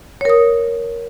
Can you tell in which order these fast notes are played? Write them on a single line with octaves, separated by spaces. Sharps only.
C#5 A#4 D#6